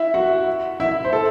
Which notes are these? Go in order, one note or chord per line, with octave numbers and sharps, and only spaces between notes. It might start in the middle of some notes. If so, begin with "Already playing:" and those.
Already playing: E4 E5
F#4 F#5
E4 E5
C5
A4